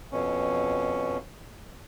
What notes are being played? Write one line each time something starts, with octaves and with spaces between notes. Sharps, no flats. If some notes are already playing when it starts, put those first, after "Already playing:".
F2 B2 C#4